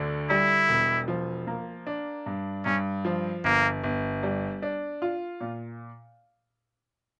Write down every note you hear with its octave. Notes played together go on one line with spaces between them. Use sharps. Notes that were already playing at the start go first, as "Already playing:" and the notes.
Already playing: D2 D3
G3 E4
E1
F3
A#3
D4
G2
G2 C#4
F3
G1 A#3
G1
G3
D4
F4
A#2